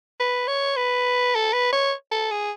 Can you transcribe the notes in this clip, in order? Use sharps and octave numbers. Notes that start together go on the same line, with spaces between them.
B4
C#5
B4
A4
B4
C#5
A4
G#4